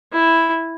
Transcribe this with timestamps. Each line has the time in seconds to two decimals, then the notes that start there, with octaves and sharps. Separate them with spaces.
0.12 E4